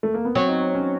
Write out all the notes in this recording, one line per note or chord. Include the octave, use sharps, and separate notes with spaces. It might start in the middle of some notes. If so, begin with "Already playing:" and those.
A3
A#3
B3
F#3 C4
D#4
C#4